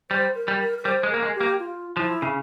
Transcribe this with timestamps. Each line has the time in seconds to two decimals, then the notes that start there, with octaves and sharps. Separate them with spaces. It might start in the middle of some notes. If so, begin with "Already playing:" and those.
0.10 G3 C5
0.35 A#4
0.48 G3
0.60 A#4
0.79 A#4
0.85 G3 C5
1.03 G#3
1.10 A#3 A#4
1.22 G#3
1.35 G4
1.41 A#3
1.59 F4
1.97 F3 E4
2.22 C#3